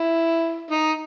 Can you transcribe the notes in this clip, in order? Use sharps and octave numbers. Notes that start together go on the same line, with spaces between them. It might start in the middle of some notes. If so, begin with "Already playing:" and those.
Already playing: E4
D#4